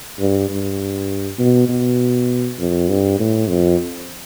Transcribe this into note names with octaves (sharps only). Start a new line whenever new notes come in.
G2
G2
B2
B2
F2
G2
A2
F2